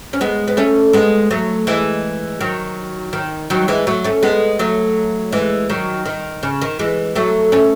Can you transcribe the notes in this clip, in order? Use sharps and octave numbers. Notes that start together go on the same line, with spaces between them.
C#4
G#3 B3
B3
A3 C#4
G#3 B3
F#3 A3
E3 G#3
D#3 F#3
D#3
D#3 F#3
E3 G#3
F#3 A3
A3 C#4
G#3 B3
F#3 A3
E3 G#3
D#3 F#3
D#3
C#3
D#3
E3 G#3
F#3 A3
A3 C#4